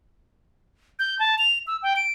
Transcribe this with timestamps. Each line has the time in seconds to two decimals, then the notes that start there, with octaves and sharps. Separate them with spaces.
0.99 G6
1.19 A5
1.39 F7
1.67 E6
1.83 G5
1.96 D7